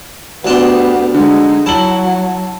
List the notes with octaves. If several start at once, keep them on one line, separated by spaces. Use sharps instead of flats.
D2 B3 D4 G4 C6
D3 G#3 D#4
F#3 E4 A5 F#7